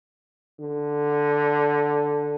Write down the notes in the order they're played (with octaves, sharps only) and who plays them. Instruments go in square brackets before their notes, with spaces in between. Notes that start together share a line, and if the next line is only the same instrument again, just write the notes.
[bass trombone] D3